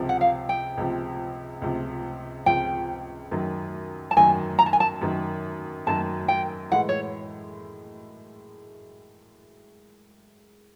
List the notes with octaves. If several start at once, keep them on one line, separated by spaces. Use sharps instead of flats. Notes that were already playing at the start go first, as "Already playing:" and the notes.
Already playing: C#2 C3 F3
F#5
F5
G5
C#2 C3 F3
C#2 C3 F3
C#2 C3 F3 G5
F#2 D#3 F#3
A5
F#2 D#3 F#3 G#5
A#5
A5
G#5
A5
F#2 D#3 F#3
F#2 D#3 F#3 A5
G5
A2 E3 G#3 F#5
C#5